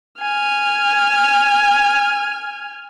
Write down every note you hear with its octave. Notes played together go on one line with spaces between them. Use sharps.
G#5 F6